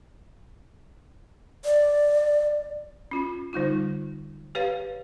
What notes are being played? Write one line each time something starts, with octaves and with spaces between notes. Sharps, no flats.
D5
C#4 F4
D3 G3 D#4 F4
G4 B4 C#5 F5